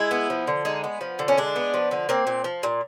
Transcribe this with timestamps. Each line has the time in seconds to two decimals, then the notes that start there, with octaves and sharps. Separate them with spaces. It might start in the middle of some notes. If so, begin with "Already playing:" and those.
Already playing: G#3 E4
0.11 B3
0.30 F3
0.47 D3
0.65 G#3 D#4
0.84 B3
1.01 F3
1.19 D3
1.28 C#4
1.37 G#3 D4
1.56 B3
1.74 F3
1.91 D3
2.09 A#3 C4
2.27 A#2
2.44 F3
2.63 A#2